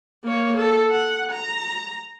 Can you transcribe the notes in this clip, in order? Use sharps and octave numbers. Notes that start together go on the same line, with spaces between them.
A#3 C#5
A4
F#5
A#5